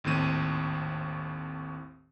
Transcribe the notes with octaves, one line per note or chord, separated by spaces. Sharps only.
G#1 D#2 A2 C4 D#7